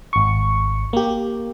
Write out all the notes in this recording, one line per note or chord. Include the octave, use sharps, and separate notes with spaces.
G#1 C#6
A#3 G4